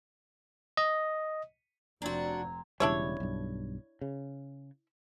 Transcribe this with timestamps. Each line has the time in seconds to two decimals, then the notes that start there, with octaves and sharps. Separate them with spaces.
0.77 D#5
2.02 F1 C4 D4 F#4 D5 G#5 A#5
2.80 E1 C#3 G3 D4 E4 C#5
3.20 B1 G2
4.01 C#3